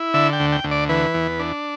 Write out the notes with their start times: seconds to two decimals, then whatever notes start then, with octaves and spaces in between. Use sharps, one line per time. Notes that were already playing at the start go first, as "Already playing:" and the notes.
Already playing: E4
0.14 D3 E5
0.33 G5
0.40 D2
0.52 G5
0.64 D2
0.71 D5
0.89 E3 B4
1.14 E2
1.39 D4